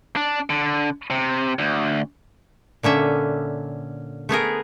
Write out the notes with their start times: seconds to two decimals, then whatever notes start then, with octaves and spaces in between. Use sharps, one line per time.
0.16 D4
0.50 D3
1.10 C3
1.59 D2
2.83 A#2 D3 C#4 E5
4.29 A3 B3 G#4 A#4